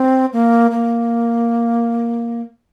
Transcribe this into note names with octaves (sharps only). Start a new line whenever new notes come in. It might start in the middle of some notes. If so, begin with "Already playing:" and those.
Already playing: C4
A#3
A#3